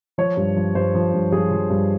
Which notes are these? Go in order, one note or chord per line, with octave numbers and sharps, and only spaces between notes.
F3 C#5
G2
F3
G2 C5
F3
G2
F3 G#4
F3
G2